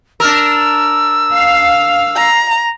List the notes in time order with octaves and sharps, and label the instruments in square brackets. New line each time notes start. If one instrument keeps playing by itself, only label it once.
[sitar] D4 A#4 [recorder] E6
[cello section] F5
[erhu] A#5